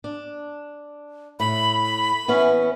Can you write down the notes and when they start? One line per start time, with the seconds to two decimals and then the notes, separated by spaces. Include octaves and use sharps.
0.04 D4
1.40 A2 B5
2.28 E3 B3 C#4